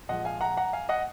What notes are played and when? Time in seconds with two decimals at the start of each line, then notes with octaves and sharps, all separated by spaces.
0.09 A#2 F3 G#3 D#5 F#5
0.25 F5 G#5
0.41 F#5 A#5
0.57 F#5 A#5
0.73 F5 G#5
0.89 D#5 F#5